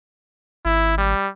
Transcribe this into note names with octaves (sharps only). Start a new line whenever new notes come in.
G#1 E4
G3